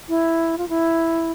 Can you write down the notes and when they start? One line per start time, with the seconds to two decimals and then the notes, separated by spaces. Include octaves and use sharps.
0.09 E4
0.58 F4
0.69 E4